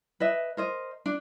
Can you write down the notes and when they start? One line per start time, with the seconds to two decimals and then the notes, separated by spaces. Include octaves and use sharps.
0.20 B4 D#5 E5
0.57 A#4 C5 D#5
1.06 D4